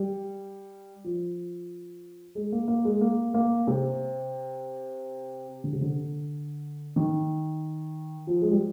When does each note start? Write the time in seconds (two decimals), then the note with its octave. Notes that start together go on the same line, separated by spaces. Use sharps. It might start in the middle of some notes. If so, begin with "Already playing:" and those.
Already playing: G3
1.04 F3
2.35 G#3
2.52 A#3
2.68 A#3
2.85 G#3
3.01 A#3
3.34 A#3
3.67 C3
5.64 D3
5.73 C3
5.81 D3
6.96 D#3
8.27 F3
8.42 G#3
8.51 G3